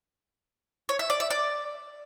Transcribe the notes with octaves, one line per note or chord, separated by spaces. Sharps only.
C#5
E5
D5
E5
D5